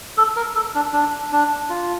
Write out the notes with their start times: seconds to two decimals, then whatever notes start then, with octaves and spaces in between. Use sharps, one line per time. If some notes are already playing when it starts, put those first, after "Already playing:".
0.17 A4
0.36 A#4
0.55 A4
0.75 D4
0.93 D4
1.32 D4
1.70 F4